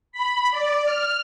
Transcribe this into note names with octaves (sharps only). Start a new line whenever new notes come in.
B5
D5
F6